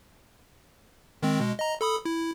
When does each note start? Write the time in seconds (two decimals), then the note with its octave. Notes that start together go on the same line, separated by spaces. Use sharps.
1.23 D#3 G#3 C4
1.40 B2 G#3
1.59 D#5 A#5
1.81 A4 B5 D#6
2.05 E4